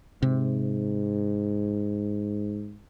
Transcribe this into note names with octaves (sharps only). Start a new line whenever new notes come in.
G#2 C3